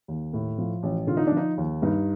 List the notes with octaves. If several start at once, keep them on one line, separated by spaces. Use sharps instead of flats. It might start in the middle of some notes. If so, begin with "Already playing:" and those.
D#2
A2
F3
A1
D3 F4
D#4
F3 D4
D#4
D#2
G2 D#4